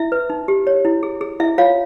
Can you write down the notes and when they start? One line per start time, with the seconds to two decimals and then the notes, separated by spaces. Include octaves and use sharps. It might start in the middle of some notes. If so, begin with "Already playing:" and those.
Already playing: E4 E5
0.12 B4
0.30 D#4
0.48 G4
0.67 C#5
0.85 E4
1.03 G#4
1.21 G#4
1.40 E4 E5
1.58 F4 C#5 F5